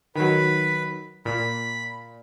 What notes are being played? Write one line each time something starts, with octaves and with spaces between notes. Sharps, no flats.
D#3 F#3 B4 B5
A#2 B5